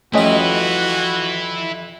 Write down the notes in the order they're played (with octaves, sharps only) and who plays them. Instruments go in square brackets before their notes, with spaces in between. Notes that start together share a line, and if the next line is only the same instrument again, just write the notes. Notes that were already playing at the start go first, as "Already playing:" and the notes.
[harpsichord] F2 G3 [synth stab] A3 C#4 D#5 [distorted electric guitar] E4 B4 [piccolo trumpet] F#4